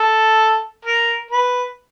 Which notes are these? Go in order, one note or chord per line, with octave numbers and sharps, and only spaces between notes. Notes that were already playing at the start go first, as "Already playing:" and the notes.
Already playing: A4
A#4
B4